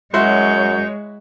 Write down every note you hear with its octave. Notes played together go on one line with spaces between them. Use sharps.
F#2 G#3 E4 F#4 C#5 C6 G6